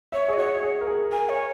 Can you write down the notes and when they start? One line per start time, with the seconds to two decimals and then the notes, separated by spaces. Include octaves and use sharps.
0.12 C#5 E5
0.28 G#4
0.33 D#5
0.37 F#4 C#5
0.63 G#4
0.81 A#4
0.87 G#4
1.12 A#4 G#5
1.29 C#5